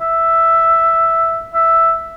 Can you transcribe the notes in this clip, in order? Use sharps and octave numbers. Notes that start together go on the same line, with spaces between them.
E5
E5